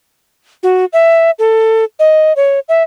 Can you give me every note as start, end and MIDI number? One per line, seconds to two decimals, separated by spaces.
0.63 0.85 66
0.93 1.31 76
1.39 1.84 69
1.99 2.33 75
2.36 2.60 73
2.69 2.83 76